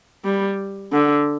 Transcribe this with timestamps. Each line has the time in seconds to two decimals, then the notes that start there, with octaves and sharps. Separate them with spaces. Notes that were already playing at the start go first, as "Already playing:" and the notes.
0.25 G3
0.92 D3